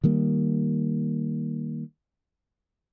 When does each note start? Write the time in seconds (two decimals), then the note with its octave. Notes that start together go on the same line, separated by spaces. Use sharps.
0.04 D#3 G3 A#3